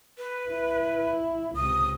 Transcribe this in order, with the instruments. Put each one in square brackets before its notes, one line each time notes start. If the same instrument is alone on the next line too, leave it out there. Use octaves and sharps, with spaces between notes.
[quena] B4
[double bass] E4
[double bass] C#2 C3 [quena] D#6